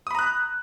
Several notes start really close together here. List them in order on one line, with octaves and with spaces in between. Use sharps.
D#6 B5 A#5 F#6